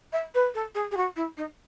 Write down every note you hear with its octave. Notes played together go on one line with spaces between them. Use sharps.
E5
B4
A4
G#4
G#4
F#4
E4
D#4